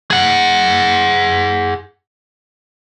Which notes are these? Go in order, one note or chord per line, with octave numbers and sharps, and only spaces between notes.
G#4 F#5